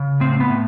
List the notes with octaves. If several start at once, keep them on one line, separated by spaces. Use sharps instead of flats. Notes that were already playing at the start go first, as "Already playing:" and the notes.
Already playing: C#3
A2 C4
B3
A2